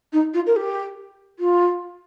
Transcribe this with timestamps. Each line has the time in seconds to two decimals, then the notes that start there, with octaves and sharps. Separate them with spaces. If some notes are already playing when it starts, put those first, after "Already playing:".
0.13 D#4
0.34 F4
0.46 A#4
0.56 G4
1.39 F4